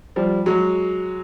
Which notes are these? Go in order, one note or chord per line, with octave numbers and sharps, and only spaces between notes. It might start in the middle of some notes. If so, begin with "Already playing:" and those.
F3 G3
F#3 G#3